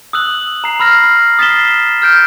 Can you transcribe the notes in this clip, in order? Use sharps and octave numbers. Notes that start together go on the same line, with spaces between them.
D#6 E6 F#6 F#7
A#5 C7
B5 E6 F6 A#6 C7
D#6 A6 B6 C7 E7 G7
F6 G6 D7